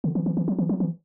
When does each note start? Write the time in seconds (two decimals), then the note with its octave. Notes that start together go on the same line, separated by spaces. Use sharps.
0.04 D3
0.15 E3
0.26 E3
0.37 E3
0.48 F#3
0.59 E3
0.69 F#3
0.80 E3